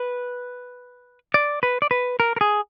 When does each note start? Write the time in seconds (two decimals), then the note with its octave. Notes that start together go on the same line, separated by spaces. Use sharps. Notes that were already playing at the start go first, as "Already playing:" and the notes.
Already playing: B4
1.34 D5
1.63 B4
1.82 D5
1.91 B4
2.20 A#4
2.36 A#4
2.41 G#4